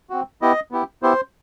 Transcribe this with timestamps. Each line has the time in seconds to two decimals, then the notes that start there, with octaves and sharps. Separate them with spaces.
0.10 C4 F#4
0.42 B3 E4 G4 D#5
0.71 B3 E4 G4
1.02 B3 E4 G4 C5